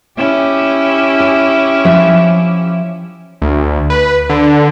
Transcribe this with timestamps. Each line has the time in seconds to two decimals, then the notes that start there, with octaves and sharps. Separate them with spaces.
0.18 C#4 E4 G4
1.20 G#5
1.85 F3 E5
3.42 D2
3.90 B4
4.30 D3